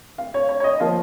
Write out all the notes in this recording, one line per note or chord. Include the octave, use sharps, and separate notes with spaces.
F5
C#5
C#5
C#5
D#5
F3 A#3 F5